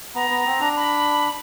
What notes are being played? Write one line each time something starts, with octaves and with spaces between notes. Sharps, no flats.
B3 A#5
B3
C4
D4
B5